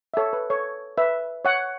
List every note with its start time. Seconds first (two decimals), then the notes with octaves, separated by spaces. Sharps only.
0.14 E5
0.17 A4 C#5
0.33 B4
0.50 A4 C#5
0.98 B4 E5
1.45 C#5 F#5